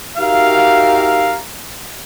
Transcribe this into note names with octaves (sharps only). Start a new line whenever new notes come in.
D#4 F#4 G4 A#4 E5 F5